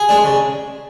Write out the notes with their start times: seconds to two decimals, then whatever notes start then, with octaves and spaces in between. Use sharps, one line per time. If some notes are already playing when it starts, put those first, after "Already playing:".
Already playing: G#4
0.09 G#3 D4
0.24 C#3